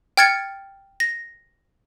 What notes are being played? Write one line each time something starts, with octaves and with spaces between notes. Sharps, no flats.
G5 F6 G#6 A6 C#7
A#6